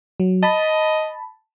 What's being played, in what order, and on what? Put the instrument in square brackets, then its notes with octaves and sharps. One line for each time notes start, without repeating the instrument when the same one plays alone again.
[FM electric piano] F#3
[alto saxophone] D#5 [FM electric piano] A5 B5